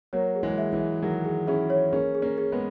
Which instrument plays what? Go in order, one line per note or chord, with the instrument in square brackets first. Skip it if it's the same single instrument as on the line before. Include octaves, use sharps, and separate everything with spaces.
[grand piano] F#3 A#3 [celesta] C#5
[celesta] G#4
[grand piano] E3 G#3
[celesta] E5
[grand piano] E3
[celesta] E5
[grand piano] D#3 F#3 [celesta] G#4
[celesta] G#4
[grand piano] C#4 E4 [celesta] G#4
[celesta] C#5
[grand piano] A#3 C#4 [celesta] G#4
[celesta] G#4
[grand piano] A#3 C#4
[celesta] G#4
[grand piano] G#3 B3